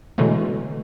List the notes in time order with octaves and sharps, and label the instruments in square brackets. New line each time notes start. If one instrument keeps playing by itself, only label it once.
[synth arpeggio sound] B2 D3 E3 F#3 G#3 A3